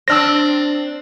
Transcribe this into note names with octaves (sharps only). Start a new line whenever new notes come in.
C4 D4 E6 F6 A#6